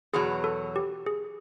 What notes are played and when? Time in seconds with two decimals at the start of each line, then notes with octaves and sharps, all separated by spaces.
0.14 E2 B2 F#3 G#4
0.44 A4
0.76 G4
1.06 G#4